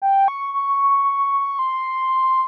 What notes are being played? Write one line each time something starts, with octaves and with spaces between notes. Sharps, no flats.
G5
C#6
C#6
C6